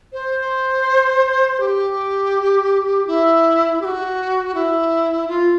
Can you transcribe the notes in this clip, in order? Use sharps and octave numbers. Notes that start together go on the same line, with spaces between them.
C5
G4
E4
G4
F#4
E4
F4